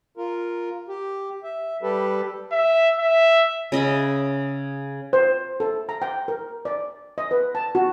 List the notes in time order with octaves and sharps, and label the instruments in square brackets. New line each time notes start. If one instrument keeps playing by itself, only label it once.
[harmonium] F4 A#4
G4
E5
G3 G4 A4 B4
[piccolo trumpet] E5
E5
[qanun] C#3 D#5 E5 B5
[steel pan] C5
A4
A#5
G5
A#4
D5
D#5
B4
A5
F#4